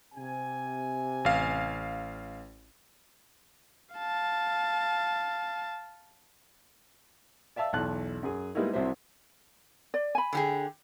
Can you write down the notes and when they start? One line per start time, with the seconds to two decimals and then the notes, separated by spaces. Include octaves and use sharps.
0.15 C3 G#5
1.25 A1 F5
3.95 F5 A5
7.56 D5 E5 F5 A5 E6
7.73 B1 E2 A5 F#6
8.23 F#2 G#4
8.55 G3 G#3 A#3 B3 D#4 E4
8.73 C2 C3 F#3 C5 E5
9.94 D5
10.15 G#5 B5
10.33 D3 G4 G#4